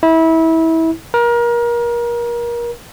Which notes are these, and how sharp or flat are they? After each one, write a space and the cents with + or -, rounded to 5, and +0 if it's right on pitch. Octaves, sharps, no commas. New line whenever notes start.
E4 -25
A#4 +30